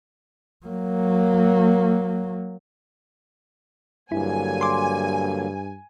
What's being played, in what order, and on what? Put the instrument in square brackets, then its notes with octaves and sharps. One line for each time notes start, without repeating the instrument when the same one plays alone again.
[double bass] F#3 A#3
[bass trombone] G2 [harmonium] D3 F#3 A#3 [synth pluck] E4 [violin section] G#5
[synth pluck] C6 D6